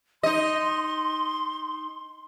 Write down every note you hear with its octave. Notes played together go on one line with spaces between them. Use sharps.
D#4 D#5 C6